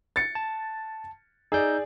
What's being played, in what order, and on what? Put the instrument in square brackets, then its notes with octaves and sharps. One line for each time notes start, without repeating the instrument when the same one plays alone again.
[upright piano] A6 C#7
[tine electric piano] A5
[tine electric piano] D#4 E6 G6 [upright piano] G#4 D5